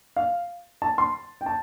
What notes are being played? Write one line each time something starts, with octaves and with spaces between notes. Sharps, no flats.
F5
A5
C6
G5
A5